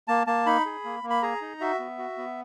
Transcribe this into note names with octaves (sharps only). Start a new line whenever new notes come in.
A#3 A5
A#3 A5
D#4 B5
G#4
A#3
A#3
B5
G#4 A#5
D#4
F#4 E5
B3
F#4
B3